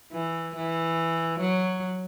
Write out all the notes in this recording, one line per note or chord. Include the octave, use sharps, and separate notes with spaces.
E3
E3
F#3